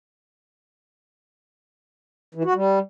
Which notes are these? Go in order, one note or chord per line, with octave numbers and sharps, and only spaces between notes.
E3
F#4
G3